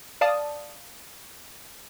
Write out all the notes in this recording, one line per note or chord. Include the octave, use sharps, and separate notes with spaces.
D5 F5 A5 D#6